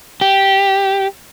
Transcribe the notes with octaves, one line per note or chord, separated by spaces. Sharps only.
G4